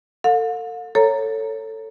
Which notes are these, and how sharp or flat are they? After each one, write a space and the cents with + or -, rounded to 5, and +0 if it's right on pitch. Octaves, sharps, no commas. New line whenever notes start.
A4 +40 F5 +45
A4 +15 C#5 -5 A#5 -10